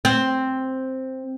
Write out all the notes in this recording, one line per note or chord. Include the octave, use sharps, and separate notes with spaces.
C4